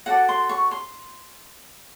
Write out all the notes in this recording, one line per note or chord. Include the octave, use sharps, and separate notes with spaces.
F#4 A4 D5 F#5
C6
C#6
C6